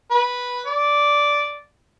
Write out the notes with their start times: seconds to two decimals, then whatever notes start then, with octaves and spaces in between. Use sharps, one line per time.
0.11 B4
0.67 D5